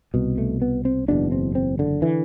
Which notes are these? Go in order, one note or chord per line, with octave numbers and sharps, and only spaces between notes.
C2 B2
A3
B3
C4
F#1 E2 B2 D4
C4
C4
D3
D3 E3